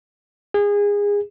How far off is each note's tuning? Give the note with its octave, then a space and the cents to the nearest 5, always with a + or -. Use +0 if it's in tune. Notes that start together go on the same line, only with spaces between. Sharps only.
G#4 -25